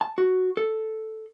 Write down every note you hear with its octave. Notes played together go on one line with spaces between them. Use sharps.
A5
F#4
A4